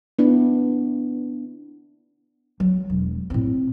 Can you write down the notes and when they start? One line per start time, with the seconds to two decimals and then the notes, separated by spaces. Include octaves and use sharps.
0.19 B3 D4 E4
2.60 F#3
2.90 E1
3.30 A2 C4